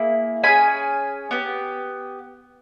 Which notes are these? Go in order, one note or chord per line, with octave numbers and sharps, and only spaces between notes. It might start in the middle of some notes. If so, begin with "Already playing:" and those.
Already playing: A#3 E4 G#4
C#4 E4 G#4 G#5 B5
B3 G4